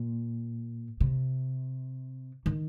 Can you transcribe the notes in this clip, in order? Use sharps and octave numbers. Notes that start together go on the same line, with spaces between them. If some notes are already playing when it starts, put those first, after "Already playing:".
Already playing: A#2
C3
D#3